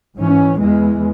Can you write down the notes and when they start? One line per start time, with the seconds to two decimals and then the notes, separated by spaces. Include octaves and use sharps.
0.18 G#2 E3 C#4
0.59 E2 E3 G#3